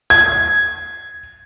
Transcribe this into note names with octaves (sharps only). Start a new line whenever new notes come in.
G#6